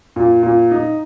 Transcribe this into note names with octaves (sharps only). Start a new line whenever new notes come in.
A#2
A#2
D#4